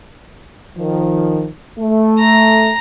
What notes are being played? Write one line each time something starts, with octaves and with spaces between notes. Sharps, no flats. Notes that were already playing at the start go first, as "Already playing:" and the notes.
D#3 F3
A3
A#5